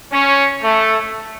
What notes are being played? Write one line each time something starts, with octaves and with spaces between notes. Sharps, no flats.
C#4
A3